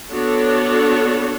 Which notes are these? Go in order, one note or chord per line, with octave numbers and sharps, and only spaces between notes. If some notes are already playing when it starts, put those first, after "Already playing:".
B3 D4 F#4 A4 C#5